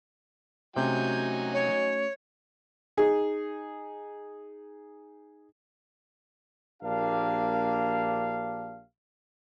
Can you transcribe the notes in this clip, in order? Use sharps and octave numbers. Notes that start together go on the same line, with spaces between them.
C3 F#3 A3 C#4 D#4 F#4 G#5 G6
C#5
D#4 G#4
A#1 A#3 D4 G4 F5